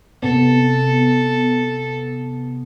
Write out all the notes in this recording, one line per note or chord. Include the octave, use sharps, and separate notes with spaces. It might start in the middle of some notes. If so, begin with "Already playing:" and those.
C3 B3 A4